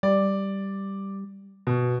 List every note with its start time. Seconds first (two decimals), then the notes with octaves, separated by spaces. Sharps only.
0.03 G3 D5
1.67 B2